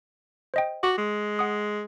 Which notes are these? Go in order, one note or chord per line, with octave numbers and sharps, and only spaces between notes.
C5 D#5 G5
F#4 C#6 D6
G#3
F#5 D#6